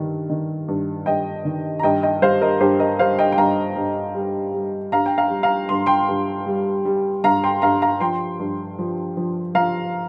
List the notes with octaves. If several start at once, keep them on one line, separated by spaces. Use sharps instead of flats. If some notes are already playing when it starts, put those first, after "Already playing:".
Already playing: G2 D#3
D#3
G2
G2 D#5 G5
D#3
A#5
G2 D#5 G5
D#5 G5
G3 C5 F5
A#4 D#5
G2 G4 C5
A#4 D#5
G3 C5 F5
D#5 G5
G5
G2 F5 A#5
G2
G3
G3
G2 F5 A#5
G5
F5 A#5
G3
F5 A#5
G2 C6
G5 C6
G2
G3
G3
G2 F5 A#5
G5 C6
G2 F5 A#5
F5 A#5
F3 G5 C6
G2
F3
F3
F3 F5 A#5